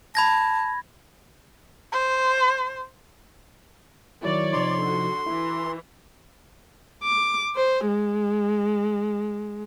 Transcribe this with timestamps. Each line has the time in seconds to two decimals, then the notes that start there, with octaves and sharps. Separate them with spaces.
0.15 A5 B5 G#6 A#6
1.93 C5
4.23 D#3 F#3 E4 C#5 D5
4.53 C3 F3 D#4 C6
4.82 D3 F#4
5.27 E3 E4
7.04 D6
7.56 C5
7.88 G#3